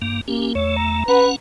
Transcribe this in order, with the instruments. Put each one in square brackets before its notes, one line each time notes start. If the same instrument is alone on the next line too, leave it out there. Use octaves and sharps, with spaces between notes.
[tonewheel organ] G2 A#3
[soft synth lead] A#3 [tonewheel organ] C#4 G4
[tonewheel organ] E2 A3 [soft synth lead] C#5
[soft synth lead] A#5
[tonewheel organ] C#4 F#5 [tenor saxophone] B4